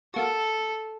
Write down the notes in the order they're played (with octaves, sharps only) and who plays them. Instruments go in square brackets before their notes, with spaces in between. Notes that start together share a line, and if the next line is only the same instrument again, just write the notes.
[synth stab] A#3 F#4 [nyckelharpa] A4